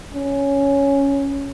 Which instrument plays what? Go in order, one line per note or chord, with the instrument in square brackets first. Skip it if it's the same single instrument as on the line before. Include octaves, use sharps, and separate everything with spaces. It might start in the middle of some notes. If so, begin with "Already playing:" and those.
[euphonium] C#4